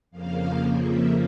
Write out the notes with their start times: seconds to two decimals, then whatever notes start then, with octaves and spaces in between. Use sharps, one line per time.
0.11 F2 C#3 F3 A#3 F5
0.83 E5